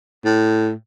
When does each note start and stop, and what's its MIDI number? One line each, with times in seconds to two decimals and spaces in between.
0.25 0.72 45